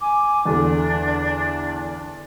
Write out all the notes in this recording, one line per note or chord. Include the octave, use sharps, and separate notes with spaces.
G#5 D6
E2 D3 D4